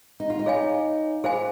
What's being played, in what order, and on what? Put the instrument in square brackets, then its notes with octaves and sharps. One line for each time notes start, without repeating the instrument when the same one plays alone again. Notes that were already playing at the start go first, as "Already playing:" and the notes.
[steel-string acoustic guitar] D#4
F4
D#4
[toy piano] G#4 C#5 F5 G#5
[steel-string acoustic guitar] F4 [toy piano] G#4 C5 F5 G#5